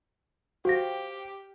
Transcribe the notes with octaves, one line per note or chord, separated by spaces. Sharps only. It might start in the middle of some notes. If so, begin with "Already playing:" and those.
F#4 G4 C5 F5 G5 A#6